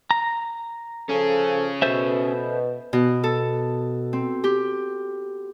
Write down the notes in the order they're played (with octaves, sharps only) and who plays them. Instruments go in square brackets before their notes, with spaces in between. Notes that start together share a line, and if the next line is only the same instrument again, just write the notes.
[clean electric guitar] A#5
[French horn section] F3 A4 [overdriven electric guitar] C#4 G#4
[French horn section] B2 [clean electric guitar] A4 C5 E5
[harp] B2
A4
C4
G4